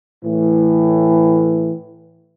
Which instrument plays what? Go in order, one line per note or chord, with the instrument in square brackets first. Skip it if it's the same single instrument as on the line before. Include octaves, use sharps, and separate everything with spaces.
[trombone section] A2 E3